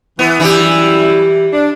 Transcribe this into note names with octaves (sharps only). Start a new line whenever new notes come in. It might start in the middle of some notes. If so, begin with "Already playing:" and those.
E3 B3
F#2 E3 G3 E4 G4
D4